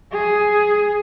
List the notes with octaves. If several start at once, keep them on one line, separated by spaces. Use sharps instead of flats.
G#4